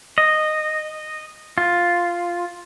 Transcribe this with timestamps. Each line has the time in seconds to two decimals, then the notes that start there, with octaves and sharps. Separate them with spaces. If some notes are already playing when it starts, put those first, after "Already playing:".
0.18 D#5
1.58 F4